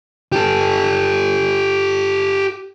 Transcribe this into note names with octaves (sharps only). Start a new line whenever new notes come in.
G4 A4